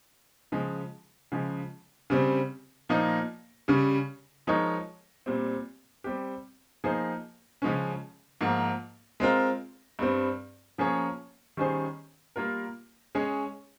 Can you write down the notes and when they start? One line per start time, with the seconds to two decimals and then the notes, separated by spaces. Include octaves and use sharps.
0.52 C#3 F3 G#3
1.32 C#3 F3 G#3
2.10 C#3 G3 C4
2.89 A#2 F3 A#3 D#4
3.68 C#3 G3 C#4
4.47 F3 G#3 D#4 A#4 C#5
5.26 A#2 G3 C4
6.04 G3 C4 G4
6.84 F3 A#3 D#4 G#4 C5
7.62 C#3 F3 G#3 C#4
8.41 G#2 F3 A#3
9.20 G#3 C4 F4 A#4
9.99 G2 G3 C4
10.78 F3 A#3 C#4 G#4 C#5
11.57 D#3 G3 C#4 G#4 C5
12.36 G3 A#3 F4 A#4
13.15 G#3 C#4 G#4 C#5